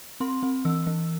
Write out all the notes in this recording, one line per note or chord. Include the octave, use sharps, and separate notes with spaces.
C4 C6
C4
E3 E6
E3